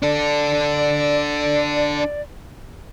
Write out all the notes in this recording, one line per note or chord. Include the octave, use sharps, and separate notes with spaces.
D4 A4 D5